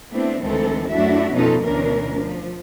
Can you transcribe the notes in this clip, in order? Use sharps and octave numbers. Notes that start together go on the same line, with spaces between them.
A3 B3 C4 D4 E4
D2 D#3 E3 G#3 C4 A4
F#2 A3 D4 E4 F#4 E5
F2 B2 C#4 D#4 F4 A4
D2 B2 E3 C#4 D4 A#4
F3